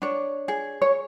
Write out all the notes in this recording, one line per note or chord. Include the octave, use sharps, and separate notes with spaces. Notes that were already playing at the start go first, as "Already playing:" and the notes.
D4 C#5
G#4
C#5